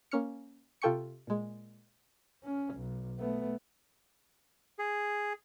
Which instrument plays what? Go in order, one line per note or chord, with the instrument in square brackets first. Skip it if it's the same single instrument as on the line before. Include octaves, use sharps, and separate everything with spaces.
[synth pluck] A#3 C#4 F6 C#7
C3 F4 A4 G5 C#6 C#7
A#2 G#3
[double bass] C#4
B1
A3 B3
[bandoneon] G#4